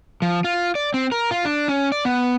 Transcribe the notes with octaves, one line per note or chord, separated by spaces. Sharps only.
F3
F4
D5
C4
A#4
F4
D4
C#4
D5
B3